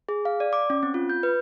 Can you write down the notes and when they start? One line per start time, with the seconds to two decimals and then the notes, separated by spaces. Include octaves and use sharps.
0.09 G#4
0.25 F5
0.40 D5
0.53 D6
0.70 C#4
0.83 C4
0.94 F4
1.09 G6
1.23 B4